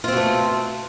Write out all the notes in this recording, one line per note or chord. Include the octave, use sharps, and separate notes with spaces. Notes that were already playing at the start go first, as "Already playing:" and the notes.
B2 A3 C4 F4